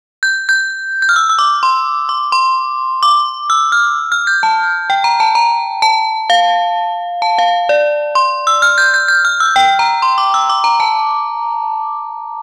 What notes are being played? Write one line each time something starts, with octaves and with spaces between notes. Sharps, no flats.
G6
G6
G6
F6
E6
E6
D6
C6
D6
C6
D6
E6
F6
F6
G6
A5
G5
A#5
A5
A#5
A5
F5
A5
F5
D5
C6
E6
F6
G6
G6
G6
F6
E6
G5
A#5
C6
D6
E6
D6
A#5
A5